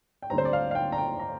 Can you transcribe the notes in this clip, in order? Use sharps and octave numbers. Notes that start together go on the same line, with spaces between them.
G5
D2 D3 G3 C4 A#5
C5
D5
F5
F5
G5
A#5
G5
A#5